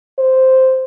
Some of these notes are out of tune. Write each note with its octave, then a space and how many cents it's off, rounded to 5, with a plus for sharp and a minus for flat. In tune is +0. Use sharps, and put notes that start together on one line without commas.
C5 -5